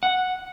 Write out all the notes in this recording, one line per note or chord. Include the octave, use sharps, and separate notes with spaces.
F#5